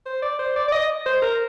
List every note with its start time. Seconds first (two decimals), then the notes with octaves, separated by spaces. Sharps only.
0.06 C5
0.22 D5
0.39 C5
0.56 D5
0.68 D5
0.72 D#5
1.06 C5
1.22 A#4